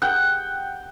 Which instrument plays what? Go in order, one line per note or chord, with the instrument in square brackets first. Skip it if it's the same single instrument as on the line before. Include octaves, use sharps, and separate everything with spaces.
[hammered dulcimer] F#5 G5